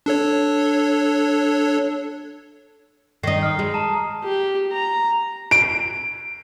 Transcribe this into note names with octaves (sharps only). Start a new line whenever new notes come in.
D4 A4 C#5
D#3 D#4 C7
D#6 F6
G#3
A5 A#5
G4
A#5
D7